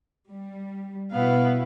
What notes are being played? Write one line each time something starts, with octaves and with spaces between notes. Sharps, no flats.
G3
B2 B3 E4 F5